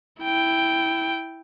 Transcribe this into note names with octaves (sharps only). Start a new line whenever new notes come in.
E4 G5